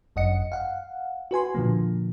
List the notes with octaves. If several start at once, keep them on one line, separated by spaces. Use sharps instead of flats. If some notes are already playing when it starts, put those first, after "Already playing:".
G1 F#2 D#5 F#5 C#7
F5 F#5
F#4 B4 G#5 C6
A#2 D3 F3 A#3